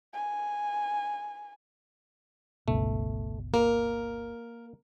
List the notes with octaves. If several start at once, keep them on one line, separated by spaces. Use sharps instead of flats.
G#5
G1 C#2 B2 A3
A#3 A#4